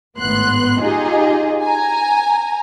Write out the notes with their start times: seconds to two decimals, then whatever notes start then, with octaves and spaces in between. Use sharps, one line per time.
0.17 G#1 A2 B3 C6 F#6
0.81 D#4 F4 G4 G#4 D#5
1.61 G#5 A#5